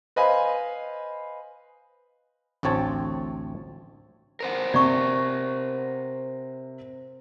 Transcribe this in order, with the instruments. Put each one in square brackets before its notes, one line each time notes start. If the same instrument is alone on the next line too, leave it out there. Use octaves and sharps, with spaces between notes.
[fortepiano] B4 C5 D#5 F5 G#5 B5
[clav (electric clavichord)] A1 D2 C4 C#5 A5
[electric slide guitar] A#4 C5 F#5
[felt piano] C3 [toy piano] D5 C#6